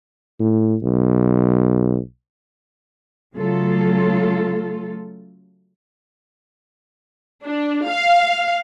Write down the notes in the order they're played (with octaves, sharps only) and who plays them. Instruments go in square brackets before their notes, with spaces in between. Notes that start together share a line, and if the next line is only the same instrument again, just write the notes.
[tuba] A2
B1
[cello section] C#3 F#3 A3 F4 A4
[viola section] D4
F5